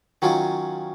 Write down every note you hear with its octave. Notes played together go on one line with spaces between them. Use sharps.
D#3 F#3 C#4 F4